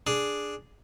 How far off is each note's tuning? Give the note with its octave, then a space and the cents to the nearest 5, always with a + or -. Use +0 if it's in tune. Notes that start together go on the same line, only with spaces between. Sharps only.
D4 +0 G#4 +0